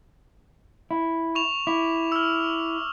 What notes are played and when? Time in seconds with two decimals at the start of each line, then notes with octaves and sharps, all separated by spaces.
0.91 E4
1.35 C#6 E7 F7
1.67 E4 D6
2.12 E6 F6